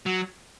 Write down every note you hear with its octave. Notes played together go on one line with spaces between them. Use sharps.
F#3